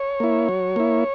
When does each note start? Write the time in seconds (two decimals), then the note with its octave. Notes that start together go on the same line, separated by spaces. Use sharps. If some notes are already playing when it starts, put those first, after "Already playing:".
Already playing: C#5
0.20 A#3 E4
0.49 F#3
0.76 A#3 E4